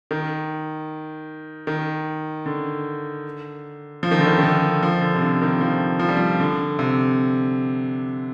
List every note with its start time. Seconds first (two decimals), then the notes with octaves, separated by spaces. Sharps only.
0.11 D#3
1.67 D#3
2.46 D3
4.03 F3
4.11 D#3
4.19 D3
4.27 D#3
4.38 D#3
4.43 D3
4.83 F3
5.01 D3
5.15 C3
5.21 D3
5.42 D#3
5.61 F3
6.00 F3
6.09 G3
6.17 F3
6.40 D3
6.79 C3